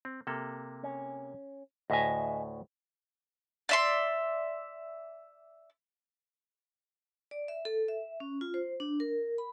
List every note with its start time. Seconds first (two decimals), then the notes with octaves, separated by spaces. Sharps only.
0.05 C4
0.27 C3 A#3 A4
0.83 C#4
1.90 D2 A2 D#5 E5 G#5
3.69 D5 E5 C6
7.31 D5
7.48 E5
7.65 A4
7.88 E5
8.20 C#4
8.41 F4
8.54 C5
8.80 D4
9.00 A#4
9.38 B5